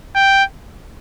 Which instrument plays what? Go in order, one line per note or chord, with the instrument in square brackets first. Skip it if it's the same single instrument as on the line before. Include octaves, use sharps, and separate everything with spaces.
[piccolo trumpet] G5